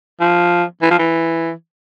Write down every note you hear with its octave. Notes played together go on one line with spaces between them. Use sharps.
F3
E3
F3
E3